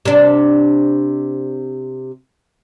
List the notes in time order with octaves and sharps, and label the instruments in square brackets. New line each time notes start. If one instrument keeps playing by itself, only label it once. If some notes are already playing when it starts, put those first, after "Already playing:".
[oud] C3 D4